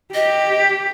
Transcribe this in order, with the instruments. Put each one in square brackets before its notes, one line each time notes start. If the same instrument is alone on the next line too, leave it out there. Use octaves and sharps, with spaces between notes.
[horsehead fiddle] G4 [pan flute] D#5